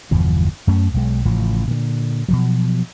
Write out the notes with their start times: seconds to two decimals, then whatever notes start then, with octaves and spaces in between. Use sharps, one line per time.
0.11 G1 E2 B2 F3
0.67 F#2 A3 C#4
0.94 B1 G#3
1.25 A1 A2 C#3 F3
1.67 A#2 D3
2.28 B2 F3 F#3